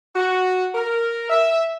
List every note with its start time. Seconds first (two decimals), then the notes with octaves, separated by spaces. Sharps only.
0.15 F#4
0.75 A#4
1.30 E5